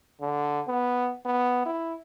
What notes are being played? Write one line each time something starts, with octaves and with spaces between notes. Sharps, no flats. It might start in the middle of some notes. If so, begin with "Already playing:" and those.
D3
B3
B3
E4